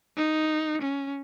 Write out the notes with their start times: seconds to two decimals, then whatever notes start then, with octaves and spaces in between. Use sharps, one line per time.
0.17 D#4
0.81 C#4